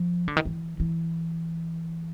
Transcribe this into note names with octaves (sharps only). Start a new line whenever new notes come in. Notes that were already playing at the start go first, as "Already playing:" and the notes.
Already playing: F3
D3
D#3
E3
E3